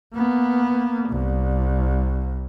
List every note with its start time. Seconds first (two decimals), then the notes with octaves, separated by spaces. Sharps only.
0.15 A#3 B3
1.09 C2